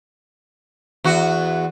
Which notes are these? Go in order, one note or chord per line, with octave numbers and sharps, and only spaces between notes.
E2 F#4